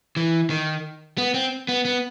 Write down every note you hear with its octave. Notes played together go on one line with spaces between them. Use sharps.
E3
D#3
B3
C4
B3
B3